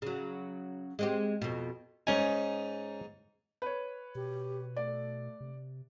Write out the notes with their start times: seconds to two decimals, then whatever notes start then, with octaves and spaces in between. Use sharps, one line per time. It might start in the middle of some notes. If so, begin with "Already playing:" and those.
0.02 C#3 F#3
0.99 G#3 C4 G4
1.42 F2 B2
2.07 G#2 C#4 D#4 G#5
3.62 B4 C#5
4.15 B2 G4
4.76 A3 D5
5.41 C3